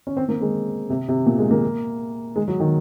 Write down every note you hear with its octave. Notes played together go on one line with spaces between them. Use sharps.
C#4
C4
A#3
G#3
C3
C3
A#2
G#3
A#3
G#3
F#3
D#3